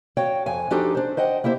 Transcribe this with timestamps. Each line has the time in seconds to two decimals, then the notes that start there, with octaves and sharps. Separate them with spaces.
0.17 F#4 C#5 F5 G5
0.46 F2 F5 G#5
0.70 F3 D4 D#4 F#4 G4 A4
0.95 D4 C5
1.17 C5 D#5 F#5 G5
1.44 A#3 E4 G4 C5